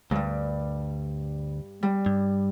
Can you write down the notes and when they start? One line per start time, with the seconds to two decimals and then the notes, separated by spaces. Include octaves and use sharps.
0.11 D2 G2 G3
1.83 G3
2.06 G2